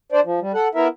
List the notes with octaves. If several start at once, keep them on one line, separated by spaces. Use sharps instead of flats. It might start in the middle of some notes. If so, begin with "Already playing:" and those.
D4 C5 D5
F3
G3
A4 F#5
B3 E4 A#4 E5